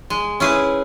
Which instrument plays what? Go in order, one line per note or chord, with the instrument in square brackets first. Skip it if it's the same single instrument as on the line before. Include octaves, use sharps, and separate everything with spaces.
[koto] G#3
C#4 E4 G#4 B4